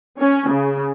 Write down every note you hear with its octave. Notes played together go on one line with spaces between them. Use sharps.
C#4
C#3